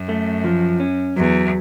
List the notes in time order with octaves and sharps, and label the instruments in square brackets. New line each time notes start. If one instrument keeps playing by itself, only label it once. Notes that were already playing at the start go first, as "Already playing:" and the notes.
Already playing: [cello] F#2
[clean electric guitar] A3
F3
C#4
[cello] E2 [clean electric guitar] F#3